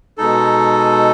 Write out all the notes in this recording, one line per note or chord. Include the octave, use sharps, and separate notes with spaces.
B2 G#3 D#4 A4